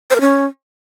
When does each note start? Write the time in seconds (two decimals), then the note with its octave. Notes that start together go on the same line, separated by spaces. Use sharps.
0.10 C5
0.15 A#4
0.21 C#4